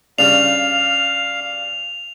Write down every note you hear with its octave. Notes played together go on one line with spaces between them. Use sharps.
C#3 G3 D4 F5 F7